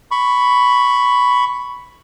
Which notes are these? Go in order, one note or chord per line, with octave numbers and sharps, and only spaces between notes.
B5 C#6